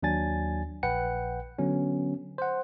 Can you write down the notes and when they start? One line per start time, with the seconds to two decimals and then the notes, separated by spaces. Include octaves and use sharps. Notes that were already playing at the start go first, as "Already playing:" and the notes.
0.03 D#2 F#3 D4 G#5 A6
0.83 A#1 B4 F#5 G5 C#7
1.59 D3 F#3 B3 C#4
2.38 C5 F#5